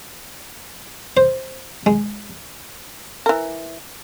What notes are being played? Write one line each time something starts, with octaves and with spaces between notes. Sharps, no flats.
C5
G#3
E3 A#4